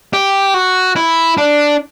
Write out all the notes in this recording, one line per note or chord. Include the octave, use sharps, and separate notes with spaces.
G4
F#4
E4
D4